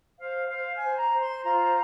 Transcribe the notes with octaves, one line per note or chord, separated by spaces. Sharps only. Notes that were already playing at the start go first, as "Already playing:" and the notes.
C5 F5
C5 F5
G#5
C5
A#5
C5
C6
F4 A#5